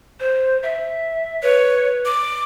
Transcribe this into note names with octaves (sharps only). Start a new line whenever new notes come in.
C5
E5
B4 C#5
D6